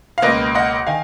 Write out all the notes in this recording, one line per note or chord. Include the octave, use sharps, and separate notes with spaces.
F5
C#2 B2 A#3 B4 D#5
D#5 F#5
D#3 F5 G#5